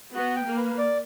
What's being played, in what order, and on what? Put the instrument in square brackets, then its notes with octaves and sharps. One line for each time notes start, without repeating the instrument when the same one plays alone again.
[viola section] B3 [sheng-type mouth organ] F#4
[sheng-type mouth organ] G5
[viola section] A#3
[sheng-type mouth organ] B4
D5